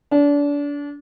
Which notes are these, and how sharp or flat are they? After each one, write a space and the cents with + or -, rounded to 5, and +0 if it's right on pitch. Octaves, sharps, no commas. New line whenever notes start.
D4 -30